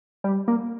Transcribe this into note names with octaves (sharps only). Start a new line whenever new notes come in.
G3
A#3